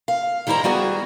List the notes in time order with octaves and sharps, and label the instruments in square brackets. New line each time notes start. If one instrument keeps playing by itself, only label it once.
[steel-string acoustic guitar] F5
D#3 G3 E4 C5 A#5
G3 B3 F#4 G#4